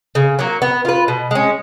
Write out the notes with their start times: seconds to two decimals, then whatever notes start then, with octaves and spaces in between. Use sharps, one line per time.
0.15 C#3
0.39 F#3 A#3
0.62 B3
0.85 F4 B4
1.08 B2
1.31 G#3 C#4